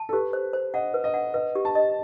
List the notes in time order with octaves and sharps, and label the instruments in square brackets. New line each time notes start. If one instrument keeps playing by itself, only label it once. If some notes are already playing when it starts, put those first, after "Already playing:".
Already playing: [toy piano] A5
[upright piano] A4
[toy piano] G4 [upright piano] B4
[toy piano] C5
C5
[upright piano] D#5 [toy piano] F#5
[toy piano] B4
[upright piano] D#5
[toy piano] F#5
[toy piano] B4 [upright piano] D#5
[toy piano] G4
[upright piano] A5
[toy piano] D#5